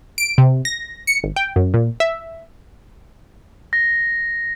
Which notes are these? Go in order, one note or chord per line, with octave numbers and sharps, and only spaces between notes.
D7
C3
A#6
C#7
G#1
G5
F#2
A#2
E5
A#6